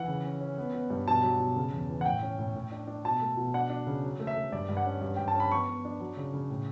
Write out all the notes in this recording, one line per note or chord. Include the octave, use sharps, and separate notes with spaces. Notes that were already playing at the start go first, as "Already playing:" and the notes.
Already playing: E3 F#5
C#3
C#4
C#4
B3
B3
G2
B2 A5
F#3
B2
C#3
E2
E3
F#5
A2 G5
C#4
A2
A2
D4
D4
B2 A5
A3
B2
D4 F#5
D4
C#3
F#3
A3
E5
A3
G2 D5
G2
F#5
C#4
G2
G2 G5
A5
C#4
B5
B3 C#6
B3
D4
F#3
C#3
C#3
A2